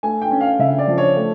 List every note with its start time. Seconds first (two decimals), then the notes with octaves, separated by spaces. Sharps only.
0.03 A3 G#5
0.22 G5
0.31 C#4
0.41 F5
0.59 C#3 E5
0.78 D5
0.87 F3
0.98 C#5
1.17 A3